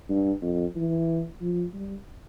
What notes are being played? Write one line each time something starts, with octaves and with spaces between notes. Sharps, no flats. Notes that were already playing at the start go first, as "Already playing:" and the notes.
G2
F2
E3
F3
G3